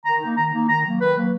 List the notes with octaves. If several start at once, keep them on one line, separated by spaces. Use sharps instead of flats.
D#3 A#5
A#3 D#4
D#3 A#5
A#3 D#4
D#3 A#5
F#3 A#3
D#3 B4
F#3 A#3